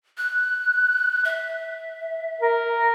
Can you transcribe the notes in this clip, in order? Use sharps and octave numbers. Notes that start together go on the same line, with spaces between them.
F#6
E5
A#4